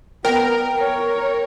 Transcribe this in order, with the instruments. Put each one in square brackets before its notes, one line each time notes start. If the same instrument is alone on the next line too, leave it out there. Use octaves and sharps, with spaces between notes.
[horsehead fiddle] B3 [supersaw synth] A#4 [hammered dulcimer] G5
[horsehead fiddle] C#5